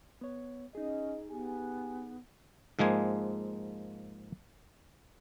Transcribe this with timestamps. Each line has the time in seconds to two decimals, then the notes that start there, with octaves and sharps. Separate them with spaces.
0.21 B3 C#5
0.75 C#4 D#4 G#4 D#5
1.30 B3 G4 G#5
2.79 G#2 F3 G#3 A#3 G#5